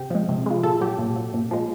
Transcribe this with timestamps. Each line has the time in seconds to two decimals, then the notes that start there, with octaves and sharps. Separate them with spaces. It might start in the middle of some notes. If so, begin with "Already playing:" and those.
Already playing: C3 G4
0.10 F3 G#3
0.29 C3
0.46 F3 G#3
0.63 A#2 A4
0.81 F#3 G4
0.99 A#2
1.16 F#3
1.34 A#2
1.51 F3 G#3